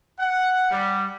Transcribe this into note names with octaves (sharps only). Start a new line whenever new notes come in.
F#5
G3